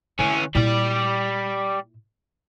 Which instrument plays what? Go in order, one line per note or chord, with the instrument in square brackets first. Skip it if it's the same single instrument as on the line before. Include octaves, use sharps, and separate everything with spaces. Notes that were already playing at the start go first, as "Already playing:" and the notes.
[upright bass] D3 [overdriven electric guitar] E3 C#4
[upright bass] A#2 E4 [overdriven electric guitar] G3 D5